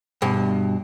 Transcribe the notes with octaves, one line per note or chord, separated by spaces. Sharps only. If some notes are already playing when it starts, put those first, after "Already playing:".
G2 B2